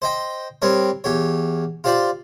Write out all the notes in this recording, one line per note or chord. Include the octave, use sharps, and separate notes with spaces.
C5 D#5 G5
G3 C4 A#4 C#5
E2 G4 C#5
F4 G4 C5 D5